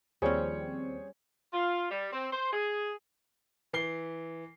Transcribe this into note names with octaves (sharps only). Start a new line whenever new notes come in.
D#2 F3 G3 C4 C#4 G#4 C5 C#5
F4
G3
C4
C5
G#4
E3 C7 G7